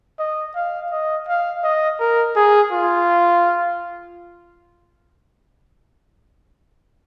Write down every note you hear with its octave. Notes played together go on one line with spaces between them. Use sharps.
D#5
F5
D#5
F5
D#5
A#4
G#4
F4